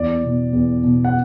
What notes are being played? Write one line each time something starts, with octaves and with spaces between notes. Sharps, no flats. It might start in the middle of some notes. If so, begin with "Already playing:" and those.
Already playing: E2 D5
B2
E2
B2
F#5